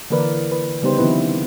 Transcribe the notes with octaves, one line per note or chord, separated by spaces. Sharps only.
D3 E3 A#3 A#4 B4 D5
B4
C#3 G3 B3 D#4 G4 C5
D#3 F3 B3 C4 E4 B4